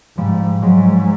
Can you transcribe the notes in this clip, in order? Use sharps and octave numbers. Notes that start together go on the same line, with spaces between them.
G#2 F3 G3
G#2 F#3 G#3